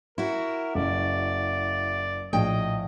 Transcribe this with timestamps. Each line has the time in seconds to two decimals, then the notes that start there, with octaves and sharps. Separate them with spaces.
0.18 E4 F#4 A#4
0.75 F#1 D5
2.33 A#1 A2 D#5 G5